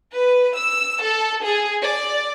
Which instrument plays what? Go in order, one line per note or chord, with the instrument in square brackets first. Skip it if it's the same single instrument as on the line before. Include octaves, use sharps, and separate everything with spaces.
[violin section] B4
E6
A4
G#4
D5